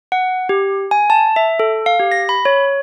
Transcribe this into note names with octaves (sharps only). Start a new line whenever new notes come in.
F#5
G4
G#5
A5
E5
A4
F5
G4
A#6
B5
C#5